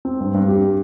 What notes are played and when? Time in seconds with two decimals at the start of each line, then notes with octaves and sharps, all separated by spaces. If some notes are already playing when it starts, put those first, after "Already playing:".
0.05 C4
0.20 G2
0.34 G2
0.48 G4